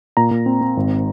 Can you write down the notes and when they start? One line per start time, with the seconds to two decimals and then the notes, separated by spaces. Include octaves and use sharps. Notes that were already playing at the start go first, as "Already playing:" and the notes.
0.17 A#2 A#5
0.31 A#2
0.46 C4
0.61 C4
0.77 G#1